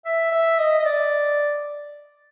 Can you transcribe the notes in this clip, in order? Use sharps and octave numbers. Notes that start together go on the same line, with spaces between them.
E5
E5
D#5
D#5
D5